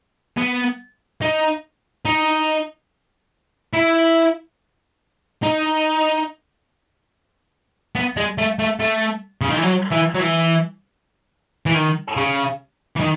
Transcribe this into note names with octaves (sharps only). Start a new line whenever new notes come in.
B3
D#4
D#4
E4
D#4
B3
G#3
A3
A3
A3
C#3
D#3
E3
F#3
E3
F#3
E3
E3
D#3
C#3
E3
D#3